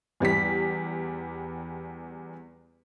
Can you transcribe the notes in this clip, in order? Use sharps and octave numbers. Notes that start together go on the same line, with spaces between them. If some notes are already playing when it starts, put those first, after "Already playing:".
E2 G3 G4 B6